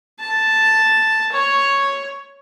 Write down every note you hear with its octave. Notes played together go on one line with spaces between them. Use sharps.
A5
C#5